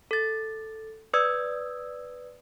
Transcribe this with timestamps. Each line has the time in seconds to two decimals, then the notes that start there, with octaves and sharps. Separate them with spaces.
0.11 A4 A6
1.14 B4 D5 D#6 E6 G#6